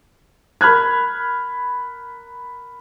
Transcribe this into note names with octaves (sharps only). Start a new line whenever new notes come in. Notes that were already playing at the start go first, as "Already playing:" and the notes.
A#4 B5 F6 F#6 G#6